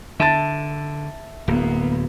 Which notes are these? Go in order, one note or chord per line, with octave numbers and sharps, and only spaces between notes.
D3 E5 A5 A6
D1 A#3 B3